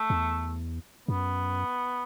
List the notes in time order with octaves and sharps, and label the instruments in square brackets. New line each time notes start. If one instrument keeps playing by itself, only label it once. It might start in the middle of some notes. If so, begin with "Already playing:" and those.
Already playing: [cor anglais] A3
[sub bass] E2
[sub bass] F#2 [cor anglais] B3